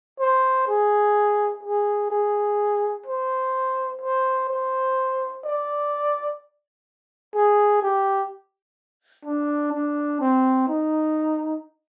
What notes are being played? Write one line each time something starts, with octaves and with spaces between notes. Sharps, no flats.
C5
G#4
G#4
G#4
C5
C5
C5
D5
G#4
G4
D4
D4
C4
D#4